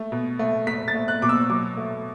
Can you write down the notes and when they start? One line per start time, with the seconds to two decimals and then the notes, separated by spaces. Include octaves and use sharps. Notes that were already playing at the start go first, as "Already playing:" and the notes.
Already playing: A3
0.12 B2
0.39 A3
0.67 A3 B6
0.88 A6
0.95 A3
1.08 F#6
1.22 B2 D6
1.29 E6
1.50 F#3 D6
1.77 A3